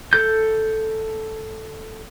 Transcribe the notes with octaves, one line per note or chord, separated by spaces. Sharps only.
A4 G6